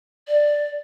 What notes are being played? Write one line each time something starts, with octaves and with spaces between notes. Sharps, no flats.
D5